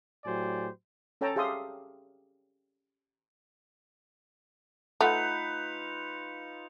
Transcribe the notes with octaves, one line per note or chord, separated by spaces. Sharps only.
A2 F#3 G4 C5 D5 G#5
C#4 A4 C#5 G5 A5 A#5
G4 G#4 E5 F5 C6 D#6
A3 D#4 F4 B4 F#5 G6 C#7 F7